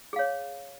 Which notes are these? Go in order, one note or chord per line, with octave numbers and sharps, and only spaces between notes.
G#4 C#5 F5